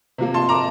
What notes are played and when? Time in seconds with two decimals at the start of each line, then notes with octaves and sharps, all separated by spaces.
0.18 C3 F3 A#3
0.34 A5 C6
0.49 A#5 D6